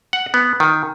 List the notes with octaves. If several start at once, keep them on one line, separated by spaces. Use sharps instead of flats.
F#5
B3
D#3